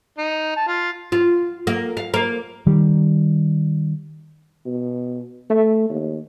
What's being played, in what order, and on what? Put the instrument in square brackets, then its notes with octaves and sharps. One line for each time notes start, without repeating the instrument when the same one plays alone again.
[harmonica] D#4
A5
F4
[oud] F4
A#3
F5
A#3
[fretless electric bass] D#3 G3
[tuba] B2
A3
D#2